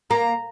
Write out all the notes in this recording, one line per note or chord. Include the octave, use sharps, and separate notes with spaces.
A#3 A#5